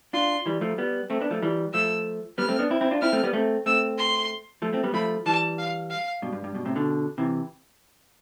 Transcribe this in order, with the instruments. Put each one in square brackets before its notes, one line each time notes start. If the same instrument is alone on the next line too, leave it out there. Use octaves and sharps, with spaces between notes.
[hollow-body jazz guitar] D4 F4 [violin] C6
[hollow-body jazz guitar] E3 G3
F3 A3
G3 B3
A3 C4
B3 D4
F3 A3
E3 G3
[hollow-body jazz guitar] F3 A3 [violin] E6
[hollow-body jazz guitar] G3 B3 [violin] F6
[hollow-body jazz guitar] A3 C4
B3 D4
C4 E4
C4 E4
D4 F4
[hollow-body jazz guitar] C4 E4 [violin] F6
[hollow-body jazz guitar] A3 C4
G3 B3
A3 C4
[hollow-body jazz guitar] A3 C4 [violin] E6
[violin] C6
[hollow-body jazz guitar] F3 A3
A3 C4
G3 B3
[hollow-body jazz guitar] F3 A3 [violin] B5
[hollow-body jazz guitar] E3 G3 [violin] A5
[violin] F5
F5
[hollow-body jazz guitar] G2 B2
G2
G2
G2 B2
A2 C3
B2 D3
C3 E3